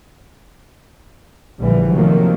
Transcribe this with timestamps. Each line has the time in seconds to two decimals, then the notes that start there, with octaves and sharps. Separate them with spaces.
1.60 A#1 D3 E3 G3
1.94 C3 D#3 F3 F#3 A3 A#3